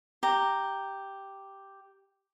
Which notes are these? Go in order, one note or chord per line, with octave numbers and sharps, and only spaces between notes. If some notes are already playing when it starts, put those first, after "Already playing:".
G4 A#5